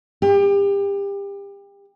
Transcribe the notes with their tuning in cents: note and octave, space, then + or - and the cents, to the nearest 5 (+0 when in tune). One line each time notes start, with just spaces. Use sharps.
G4 +30